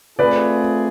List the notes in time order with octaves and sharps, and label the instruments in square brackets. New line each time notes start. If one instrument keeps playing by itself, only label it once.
[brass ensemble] A3 C4 F4 G#4 [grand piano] B4 D5